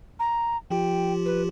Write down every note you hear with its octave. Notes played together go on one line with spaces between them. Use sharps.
A#5
F3 F4 G4 G5
B4